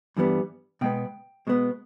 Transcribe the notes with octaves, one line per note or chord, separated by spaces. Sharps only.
G2 E3 G3 B3
B2 G#3 B3 G5
B2 G#3 B3